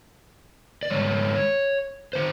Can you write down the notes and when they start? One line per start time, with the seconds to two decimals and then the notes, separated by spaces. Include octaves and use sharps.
0.83 D5
0.90 G#2 D#3 G#3 C#5
2.13 D#3 C5